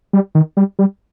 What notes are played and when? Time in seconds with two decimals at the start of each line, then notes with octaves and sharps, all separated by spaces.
0.13 G3
0.35 D#3
0.57 G3
0.79 G3